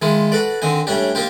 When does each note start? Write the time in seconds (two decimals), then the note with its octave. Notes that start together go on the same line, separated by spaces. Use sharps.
0.02 D#3 G#3 E4 F4
0.32 F#4 A4 B4 D5
0.62 D3 D#3 C4 D#4 G#5
0.87 A2 G3 C#4 D4 G4
1.15 A#3 D#4 F4 G4 C5